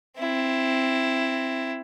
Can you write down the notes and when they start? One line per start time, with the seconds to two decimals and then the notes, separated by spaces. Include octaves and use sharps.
0.18 C4 E4